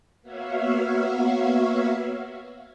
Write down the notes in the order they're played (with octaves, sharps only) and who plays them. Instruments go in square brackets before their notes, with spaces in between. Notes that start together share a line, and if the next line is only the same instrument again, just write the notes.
[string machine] A#3 B3 F#4 C#5 E5 F5